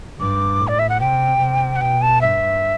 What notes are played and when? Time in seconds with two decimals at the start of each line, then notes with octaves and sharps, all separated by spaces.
0.20 G2 D6
0.60 A2
0.68 D5
0.79 E5
0.89 F#5
1.00 C3 G5
1.40 C3
1.76 F#5
1.81 B2 G5
2.02 A5
2.21 G2 E5